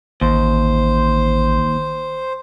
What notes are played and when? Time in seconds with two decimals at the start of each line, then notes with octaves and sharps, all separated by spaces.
0.21 A1 D#2 C5